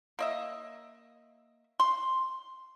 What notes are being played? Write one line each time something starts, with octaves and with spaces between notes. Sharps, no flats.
A#3 D#5 E5
C6